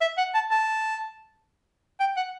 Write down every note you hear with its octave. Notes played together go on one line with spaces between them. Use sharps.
E5
F#5
A5
A5
G5
F#5